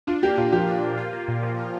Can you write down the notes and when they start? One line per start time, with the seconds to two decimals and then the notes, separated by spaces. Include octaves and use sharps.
0.07 D4 F4
0.22 A#3 G4
0.38 A#2 F4
0.52 F3 G4
0.67 D4
0.83 A#3
0.98 F4
1.13 A#3
1.28 A#2
1.43 F3
1.58 F4